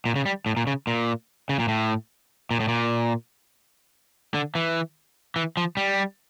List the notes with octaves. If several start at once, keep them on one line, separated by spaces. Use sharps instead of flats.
A#2
C#3
G3
A2
A#2
C#3
A#2
C#3
A#2
A2
A#2
A2
A#2
D3
E3
E3
F3
G3